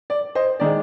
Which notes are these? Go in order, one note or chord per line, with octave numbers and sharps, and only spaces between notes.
D5
C5 D#5
D#3 G#3 D5